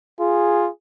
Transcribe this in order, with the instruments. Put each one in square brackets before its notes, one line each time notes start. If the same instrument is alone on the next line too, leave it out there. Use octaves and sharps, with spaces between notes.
[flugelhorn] F4 [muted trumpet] G#4